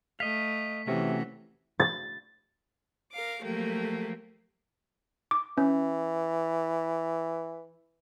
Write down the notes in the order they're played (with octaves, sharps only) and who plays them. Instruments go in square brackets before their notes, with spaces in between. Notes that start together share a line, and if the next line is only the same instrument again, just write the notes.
[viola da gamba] A3 [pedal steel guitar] D#5 F5 [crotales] B6
[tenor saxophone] C3 [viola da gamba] E3 [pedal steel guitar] A3 C#4 F#4
[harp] A6
[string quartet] A#4 F5 D6
F3 F#3 A3 A#3 G4
[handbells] D6
[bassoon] E3 [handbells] C#4